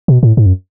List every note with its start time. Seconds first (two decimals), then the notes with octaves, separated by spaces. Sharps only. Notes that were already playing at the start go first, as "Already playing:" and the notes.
0.08 B2
0.23 A2
0.37 G#2
0.46 F#2